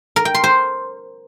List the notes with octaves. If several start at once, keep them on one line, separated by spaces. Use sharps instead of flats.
A#4
G5
C6
C5